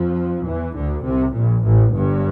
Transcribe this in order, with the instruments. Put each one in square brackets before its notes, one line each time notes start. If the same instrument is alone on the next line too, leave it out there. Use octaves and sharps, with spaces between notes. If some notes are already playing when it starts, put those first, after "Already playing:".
Already playing: [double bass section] F2 F3
E2 E3
D2 D3
C2 C3
A#1 A#2
A1 A2
G1 G2